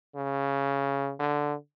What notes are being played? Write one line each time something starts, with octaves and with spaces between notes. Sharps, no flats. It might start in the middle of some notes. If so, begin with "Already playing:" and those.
C#3
D3